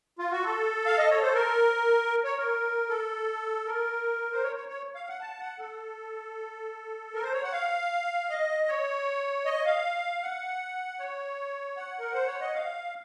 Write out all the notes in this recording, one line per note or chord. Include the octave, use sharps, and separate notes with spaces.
F4
F#4
A4
F5
D#5
C#5
C5
A#4
C#5
A#4
A4
A#4
C5
C#5
C#5
C#5
F5
F#5
A5
F#5
A4
A#4
C5
C#5
F#5
F5
D#5
C#5
D#5
F5
F#5
C#5
F#5
A#4
C5
C#5
D#5
F5